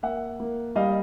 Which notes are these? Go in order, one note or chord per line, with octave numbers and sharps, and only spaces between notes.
A#3 E5 F#5
A#3
G3 D#5 F5